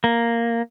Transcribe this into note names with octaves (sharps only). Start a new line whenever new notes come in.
A#3